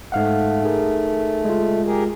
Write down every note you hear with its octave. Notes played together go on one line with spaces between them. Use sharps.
G#2 A3 F5 F#5
D#4 G#4 A#4
G#3 F4
G4 G#4 A#4